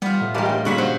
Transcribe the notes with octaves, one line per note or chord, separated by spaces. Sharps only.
G3 B3 F4
A2
A1 G2 G3 G#3 A#4
G5
G2 A#2 C#3 F#4 F#5 B5
F#3 C5